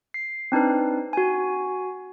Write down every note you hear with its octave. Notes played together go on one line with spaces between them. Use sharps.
C7
C4 D4 D#4 B4
F#4 G#5